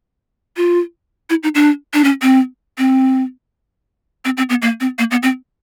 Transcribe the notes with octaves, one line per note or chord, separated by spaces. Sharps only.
F4
E4
D#4
D4
D4
C#4
C4
C4
C4
C4
B3
A#3
C4
A#3
B3
C4